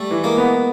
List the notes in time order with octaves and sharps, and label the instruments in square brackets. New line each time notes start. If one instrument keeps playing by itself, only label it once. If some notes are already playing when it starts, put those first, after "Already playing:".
Already playing: [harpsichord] G3 A3
[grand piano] E3
[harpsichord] G#3 A#3
[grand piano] B3